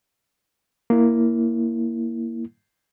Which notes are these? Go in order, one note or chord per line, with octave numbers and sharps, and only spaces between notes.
A#3 E4